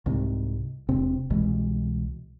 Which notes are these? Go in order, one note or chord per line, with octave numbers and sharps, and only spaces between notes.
C2 G#2 C3
E1 C3 C4
C2 B2 E3 G#3